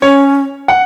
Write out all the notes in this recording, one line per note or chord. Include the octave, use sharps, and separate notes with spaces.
C#4 C#5
F#5